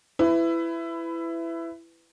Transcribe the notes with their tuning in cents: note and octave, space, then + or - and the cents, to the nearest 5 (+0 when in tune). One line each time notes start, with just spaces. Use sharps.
E4 +15 B4 +25